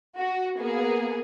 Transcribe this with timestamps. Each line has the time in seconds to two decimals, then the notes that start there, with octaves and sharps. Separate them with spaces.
0.18 F#4
0.57 A#3 B3 G#4